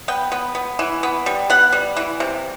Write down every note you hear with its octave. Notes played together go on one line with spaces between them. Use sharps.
B3 G5
B3
B3
E3
B3
G3
B3 F#5
G3
E3
C3